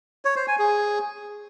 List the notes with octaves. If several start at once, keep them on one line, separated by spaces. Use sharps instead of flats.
C#5
C5
G#5
G#4